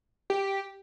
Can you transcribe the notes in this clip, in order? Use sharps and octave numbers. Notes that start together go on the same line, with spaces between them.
G4